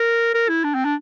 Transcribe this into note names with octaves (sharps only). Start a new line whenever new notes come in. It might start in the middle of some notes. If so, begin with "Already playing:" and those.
Already playing: A#4
A#4
E4
D4
C4
D4